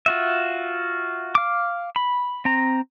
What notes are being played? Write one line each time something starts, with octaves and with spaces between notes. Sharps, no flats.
F4 F#4 E5
F5 D6
B5
C4 A#5